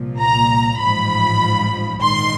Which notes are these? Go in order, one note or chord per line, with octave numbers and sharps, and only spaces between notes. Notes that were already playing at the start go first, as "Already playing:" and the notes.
Already playing: C2 A#2 F3
A#5
A1 G#2 F3 B5
A#1 G#2 D#3 C6